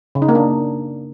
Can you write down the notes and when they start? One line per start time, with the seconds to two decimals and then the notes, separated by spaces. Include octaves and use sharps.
0.15 C#3
0.22 D#4
0.29 A#3
0.35 D4